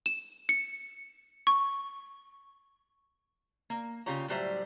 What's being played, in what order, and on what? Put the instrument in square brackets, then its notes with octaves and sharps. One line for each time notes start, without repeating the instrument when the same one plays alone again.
[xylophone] E7
C#7
C#6
[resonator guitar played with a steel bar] A#3
C#3 F4 G4 C#5 A#5
A2 F#3 G3 C5 E5